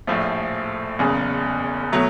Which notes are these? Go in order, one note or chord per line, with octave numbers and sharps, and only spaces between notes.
A#1 A2 F3 A3
F#1 E2 C#3
B2 F#3 A3